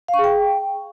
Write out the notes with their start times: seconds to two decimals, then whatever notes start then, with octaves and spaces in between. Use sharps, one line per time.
0.08 F5
0.14 C#6
0.19 G#4
0.24 G5